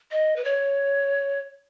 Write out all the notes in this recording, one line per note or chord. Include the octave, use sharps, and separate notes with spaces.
D#5
B4
C#5